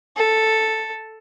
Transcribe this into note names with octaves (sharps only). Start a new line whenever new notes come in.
A4